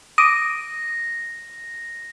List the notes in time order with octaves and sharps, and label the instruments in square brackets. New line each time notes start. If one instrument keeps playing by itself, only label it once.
[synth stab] D6 D#6 [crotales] A#6